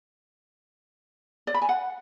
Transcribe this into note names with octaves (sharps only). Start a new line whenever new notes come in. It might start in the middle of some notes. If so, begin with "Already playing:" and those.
D5
B5
G#5
F#5